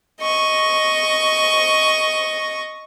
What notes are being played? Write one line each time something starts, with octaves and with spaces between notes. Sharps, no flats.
D#5 C#6